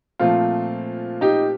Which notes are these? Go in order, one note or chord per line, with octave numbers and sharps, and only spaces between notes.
A#2 F3 A3 C4 F4
D#4 G4